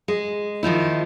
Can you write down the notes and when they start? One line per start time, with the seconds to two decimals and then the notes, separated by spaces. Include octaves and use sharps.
0.08 G#3
0.63 D#3 F3 D#4 E4